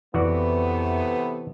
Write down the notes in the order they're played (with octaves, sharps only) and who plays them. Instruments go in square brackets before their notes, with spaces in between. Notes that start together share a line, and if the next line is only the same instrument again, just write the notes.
[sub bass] F2 [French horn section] C3 A3 B3 [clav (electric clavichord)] E3 F#4 D5